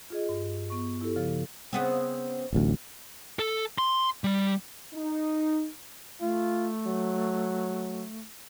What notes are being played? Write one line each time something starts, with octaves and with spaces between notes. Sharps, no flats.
F4 G#4 D#5
G2
B3 C#6
E4 G4 A4
C#3 F3
C#3 B3 C4
D1 A1 D2
A4
C6
G3
D#4
A3 F4
F#3